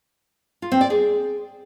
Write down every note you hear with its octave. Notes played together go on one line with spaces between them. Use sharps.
F4
C4
D5
G#4